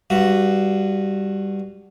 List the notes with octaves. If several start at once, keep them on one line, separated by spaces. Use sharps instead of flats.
G2 F#4